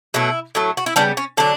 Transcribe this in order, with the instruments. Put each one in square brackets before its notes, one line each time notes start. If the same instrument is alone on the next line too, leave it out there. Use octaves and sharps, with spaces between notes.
[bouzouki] B2 F#3 A3 E4
A2 F#3 A3
F#4
E4
C#3 G3 B3 D4
C#4
D3 F#3 D4